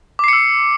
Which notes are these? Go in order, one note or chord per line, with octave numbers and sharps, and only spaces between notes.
D6 E6 C7 C#7